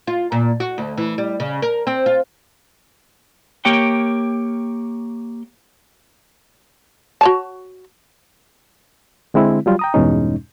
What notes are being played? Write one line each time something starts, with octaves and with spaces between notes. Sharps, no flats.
F4
A#2
F#4
D2
E3
G3
C#3
A#4
C4
F4
A#3 G4 C#5 G5
F#4 C#5 A5
D3 G#3 C4 E4
F#3 G3 F4
G5 A#5 D#6
E2 G2 B2 G#3 C#4 D#4